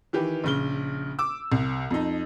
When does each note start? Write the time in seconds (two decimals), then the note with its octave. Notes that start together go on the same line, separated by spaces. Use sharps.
0.13 D#3 E3 G4 B4
0.44 A#1 C#3 G7
1.19 D6 E6
1.52 C2
1.91 F2 D#4